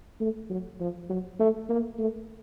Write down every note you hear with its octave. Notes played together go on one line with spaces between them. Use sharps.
A3
F#3
F3
F#3
A3
A#3
A3